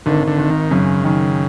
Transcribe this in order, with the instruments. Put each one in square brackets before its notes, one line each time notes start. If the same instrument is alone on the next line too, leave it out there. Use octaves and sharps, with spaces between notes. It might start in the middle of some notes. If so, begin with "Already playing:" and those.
[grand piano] G#1 [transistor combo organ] D3
[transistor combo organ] D3
[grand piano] G#1
[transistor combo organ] D#3
[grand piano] F#2 [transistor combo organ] C#3
[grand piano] D#3